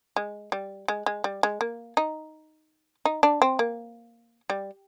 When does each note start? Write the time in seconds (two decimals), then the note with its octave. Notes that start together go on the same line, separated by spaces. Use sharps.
0.16 G#3
0.52 G3
0.88 G#3
1.06 G#3
1.24 G3
1.43 G#3
1.61 A#3
1.97 D#4
3.05 D#4
3.23 D4
3.42 C4
3.59 A#3
4.50 G3